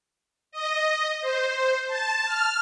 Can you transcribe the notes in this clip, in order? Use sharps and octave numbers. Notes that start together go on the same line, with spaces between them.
D#5
C5
A5
F6